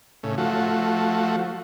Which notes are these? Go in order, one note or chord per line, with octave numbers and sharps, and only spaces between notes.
A2 C#3
F3 A3 F#4